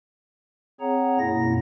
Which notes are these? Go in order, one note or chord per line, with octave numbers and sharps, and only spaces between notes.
C4 G#4 C#5 F#5 A#5
F#2 B2 A#3 E4 A#6